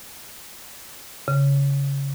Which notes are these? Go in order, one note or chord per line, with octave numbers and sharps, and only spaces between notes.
C#3